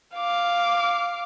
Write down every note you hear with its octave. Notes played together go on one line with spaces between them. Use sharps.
F5 D6